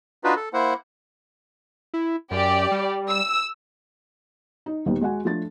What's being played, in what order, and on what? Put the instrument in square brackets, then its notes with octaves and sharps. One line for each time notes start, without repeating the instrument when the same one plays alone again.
[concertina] D4 D#4 F4 F#4 B4
A4
A#3 E4 C5 F#5
[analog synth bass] E4
[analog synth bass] F#2 [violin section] G4 D5
[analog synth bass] G3
[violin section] E6
[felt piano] D#4
D#2 A#2 D#3 G3 B3
G#3 F#4 F#5 G#5
F3 A3 D4 A4 A6